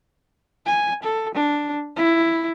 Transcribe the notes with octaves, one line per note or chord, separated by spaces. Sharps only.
G#5
A4
D4
E4